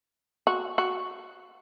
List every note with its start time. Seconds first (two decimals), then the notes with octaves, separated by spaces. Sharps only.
0.47 F#4
0.78 F#4